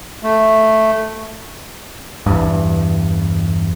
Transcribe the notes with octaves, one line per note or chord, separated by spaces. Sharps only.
A3
E2 G2